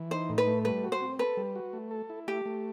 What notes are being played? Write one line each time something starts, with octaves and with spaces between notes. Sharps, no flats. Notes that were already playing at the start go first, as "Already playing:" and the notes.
Already playing: E3
D#4 C5
A2
B4
A3
G3 B4
F#4
C5
C4
A4 B4
G3
F#4
A3
A4
E4
A3 G4
A3